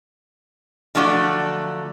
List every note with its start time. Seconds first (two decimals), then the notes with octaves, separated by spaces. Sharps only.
0.95 D3 F3 F#3 A3 F#4 D5